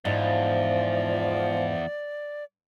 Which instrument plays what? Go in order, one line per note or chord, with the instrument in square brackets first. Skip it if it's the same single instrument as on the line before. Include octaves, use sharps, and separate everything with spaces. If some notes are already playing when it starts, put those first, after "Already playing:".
[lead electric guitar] E2 [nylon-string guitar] G#2 [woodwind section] F3 [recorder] D5